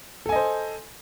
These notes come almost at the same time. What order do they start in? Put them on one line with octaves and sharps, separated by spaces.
A4 G#5 D#5 C5